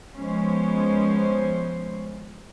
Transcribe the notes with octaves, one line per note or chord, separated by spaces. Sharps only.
F3 G#3 B3 C#4 C5